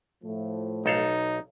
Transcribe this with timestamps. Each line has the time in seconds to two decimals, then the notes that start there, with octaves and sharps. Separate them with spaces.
0.23 A2 F3 A3
0.86 B1 D#4 A4 F5